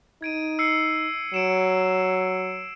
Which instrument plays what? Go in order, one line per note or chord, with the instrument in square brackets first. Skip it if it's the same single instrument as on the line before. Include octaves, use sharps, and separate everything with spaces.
[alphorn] D#4 [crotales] G#6 D7 D#7
[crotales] E6 C7 C#7
[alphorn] F#3 [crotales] C#7 D7 E7